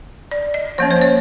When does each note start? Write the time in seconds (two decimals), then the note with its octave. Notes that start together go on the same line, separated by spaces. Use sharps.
0.31 D5
0.54 D#5
0.78 F3 A#3 C#4 C#5
0.91 C5
1.02 C#5